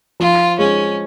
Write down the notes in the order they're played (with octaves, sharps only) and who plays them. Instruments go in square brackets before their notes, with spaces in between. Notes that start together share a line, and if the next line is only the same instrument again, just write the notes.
[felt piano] F3 [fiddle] F4
[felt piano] G#3 [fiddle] C#4